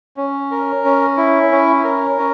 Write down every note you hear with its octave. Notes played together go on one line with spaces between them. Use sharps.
C#4
A#4
C#4
E4
C#4
A#4
C#4